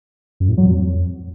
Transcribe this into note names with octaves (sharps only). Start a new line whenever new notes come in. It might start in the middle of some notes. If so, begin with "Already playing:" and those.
F#2
A2
F#3
F2